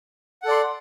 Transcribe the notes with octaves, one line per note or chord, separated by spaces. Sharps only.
A4 D5 F#5 C6